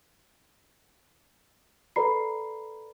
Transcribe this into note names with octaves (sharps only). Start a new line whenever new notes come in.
A4 B4 D5 A#5 B5 C7